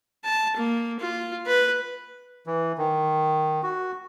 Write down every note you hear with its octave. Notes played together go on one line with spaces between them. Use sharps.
A5
A#3
F4
B4
E3
D#3
F#4